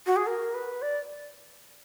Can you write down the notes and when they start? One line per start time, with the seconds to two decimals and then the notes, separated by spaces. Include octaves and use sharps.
0.07 F#4
0.16 G#4
0.27 A#4
0.54 B4
0.82 D5